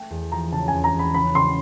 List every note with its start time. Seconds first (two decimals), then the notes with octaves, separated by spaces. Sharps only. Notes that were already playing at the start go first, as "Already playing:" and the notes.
Already playing: A3 G5
0.10 E2
0.32 F3 A#5
0.52 C#3 A5
0.68 E2 G#5
0.84 A#5
0.94 E2 B5
1.14 C#3 B5
1.35 C#3 C6